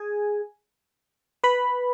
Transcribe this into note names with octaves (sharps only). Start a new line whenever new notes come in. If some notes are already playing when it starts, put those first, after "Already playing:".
Already playing: G#4 G#5
B4 B5